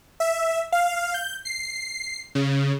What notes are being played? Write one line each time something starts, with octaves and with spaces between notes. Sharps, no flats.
E5
F5
G6
C7
C#3